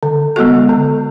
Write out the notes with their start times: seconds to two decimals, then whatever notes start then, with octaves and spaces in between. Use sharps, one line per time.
0.03 D3
0.36 G#3 B3 F#4 A4
0.69 D3